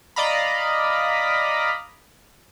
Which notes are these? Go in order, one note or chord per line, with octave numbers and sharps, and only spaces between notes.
D5 D#5 F5 A#5 B5